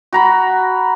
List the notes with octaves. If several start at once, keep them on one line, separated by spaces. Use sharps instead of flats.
F#4 A#5 B5